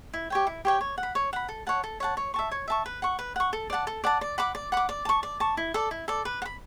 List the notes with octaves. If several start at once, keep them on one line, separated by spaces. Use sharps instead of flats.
E4
G4 C#5 G5
E4
G4 C#5 G5
C#5
F#5
B5
C#5
F#5 B5
A4
C#5 F#5 A5
A4
C#5 F#5 A5
C#5
E5 A5 C#6
C#5
E5 A5 C#6
B4
F#5 C#6
B4
F#5 C#6
A4
D5 F#5 A5
A4
D5 F#5 A5
D5
F#5 B5 D6
D5
F#5 B5 D6
D5
A5 C#6
D5
A5 C#6
E4
A4 D5
E4
A4 D5
B4
F#5
B5